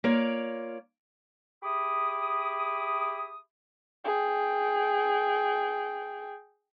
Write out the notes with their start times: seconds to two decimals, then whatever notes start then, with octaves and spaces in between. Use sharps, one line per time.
0.04 A#3 F4 C#5 D5
1.63 G4 G#4 E5 B5 D6 D#6
4.05 G#4 G5